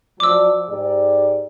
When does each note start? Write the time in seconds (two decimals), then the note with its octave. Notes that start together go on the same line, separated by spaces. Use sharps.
0.20 F3 F#3 D5 D6 E6
0.69 G#2 G4 D5